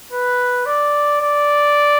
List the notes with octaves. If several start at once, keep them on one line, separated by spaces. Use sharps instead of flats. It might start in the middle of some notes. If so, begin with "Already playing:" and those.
B4
D5
D5